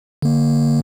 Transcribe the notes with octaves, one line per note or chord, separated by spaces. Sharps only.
D3 A#3